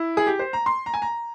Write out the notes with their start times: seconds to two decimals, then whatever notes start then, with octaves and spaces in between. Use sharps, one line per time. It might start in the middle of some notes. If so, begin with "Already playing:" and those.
Already playing: E4
0.17 G#4
0.27 G4
0.39 C5
0.53 A#5
0.66 C6
0.86 A#5
0.94 G#5
1.02 A#5